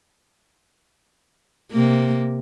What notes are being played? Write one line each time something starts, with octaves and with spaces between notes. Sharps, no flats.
C3 A#3